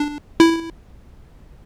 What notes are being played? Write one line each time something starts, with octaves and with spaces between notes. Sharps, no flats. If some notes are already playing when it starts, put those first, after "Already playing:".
Already playing: D4
E4